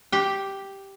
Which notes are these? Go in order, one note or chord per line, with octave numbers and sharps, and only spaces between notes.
G4 G5